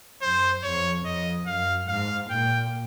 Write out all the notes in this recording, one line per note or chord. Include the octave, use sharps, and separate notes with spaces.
F#2 C5
F2 C#5
F2 D#5
F#2 F5
G#2 F5
A#2 G5